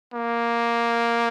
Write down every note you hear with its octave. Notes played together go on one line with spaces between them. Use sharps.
A#3